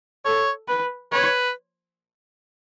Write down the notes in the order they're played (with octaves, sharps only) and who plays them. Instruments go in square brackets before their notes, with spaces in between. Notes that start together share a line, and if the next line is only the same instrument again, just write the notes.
[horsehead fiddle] A4 [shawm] C#5
[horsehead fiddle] B4
[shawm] B4 [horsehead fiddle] C#5